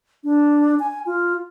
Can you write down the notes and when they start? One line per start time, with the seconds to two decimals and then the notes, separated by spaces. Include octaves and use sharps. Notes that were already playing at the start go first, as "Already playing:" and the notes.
0.24 D4
0.80 G#5
1.06 F4